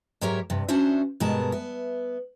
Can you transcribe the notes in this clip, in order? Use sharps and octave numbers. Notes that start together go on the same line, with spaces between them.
G#2 F#3 G4 A#4 C#5 E5
G2 C3
C#4 D4 F#4 C5 E5
G2 B2 G#3 B3 A#4 A5
B3 E5